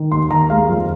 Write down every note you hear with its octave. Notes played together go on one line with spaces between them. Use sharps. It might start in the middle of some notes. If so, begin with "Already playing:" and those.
Already playing: D#3
D#2 C6
D#2 A#5
G#3 F5
F2